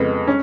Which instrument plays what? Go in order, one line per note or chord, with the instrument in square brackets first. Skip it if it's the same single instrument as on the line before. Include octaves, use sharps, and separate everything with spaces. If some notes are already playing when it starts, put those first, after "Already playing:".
Already playing: [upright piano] F2 C#3 G#3 B3
C#4